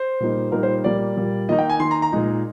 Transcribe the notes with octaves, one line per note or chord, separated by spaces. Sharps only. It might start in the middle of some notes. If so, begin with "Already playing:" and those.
Already playing: C5
A#2 G3 A#3 D#4
A#2 G3 A#3 D#4 A#4
C5
A#2 G3 A#3 D5
A#2 G3 A#3
D#3 A#3 D#4 D#5
G5
G#5
D#3 A#3 D#4 C6
A#5
A#5
A#2 G#3 D#4